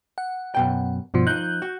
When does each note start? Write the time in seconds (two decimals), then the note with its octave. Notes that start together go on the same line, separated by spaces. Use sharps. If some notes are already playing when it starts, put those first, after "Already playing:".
0.18 F#5
0.55 F#2 B2 G5
1.14 G2 B2 F3
1.27 F3 D#4 F#6 G6
1.62 F#4